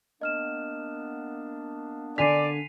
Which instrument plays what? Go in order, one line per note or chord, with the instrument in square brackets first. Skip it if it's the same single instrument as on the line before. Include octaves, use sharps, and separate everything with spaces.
[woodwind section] A#3 B3 D4 [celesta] D#5 F6 E7
[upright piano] D3 G#5 B6 [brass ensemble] D5 [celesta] C7 D#7 F7